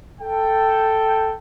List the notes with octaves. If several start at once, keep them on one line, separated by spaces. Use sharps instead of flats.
A4 G5